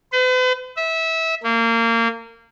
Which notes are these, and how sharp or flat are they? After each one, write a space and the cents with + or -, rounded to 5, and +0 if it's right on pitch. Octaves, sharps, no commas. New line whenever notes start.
B4 +45
E5 -20
A#3 -25